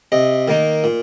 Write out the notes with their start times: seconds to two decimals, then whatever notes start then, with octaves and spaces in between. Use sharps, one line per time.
0.12 C3 D#5
0.48 D#3 A#3 D#4
0.84 A#2